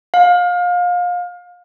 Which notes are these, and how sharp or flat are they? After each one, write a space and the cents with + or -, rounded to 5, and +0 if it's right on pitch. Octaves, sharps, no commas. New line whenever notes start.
F5 +30